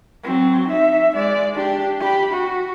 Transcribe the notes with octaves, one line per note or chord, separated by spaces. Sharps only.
F#3 C4
D#4 E5
G#3 D5
D4 G4
G4 B5
F#4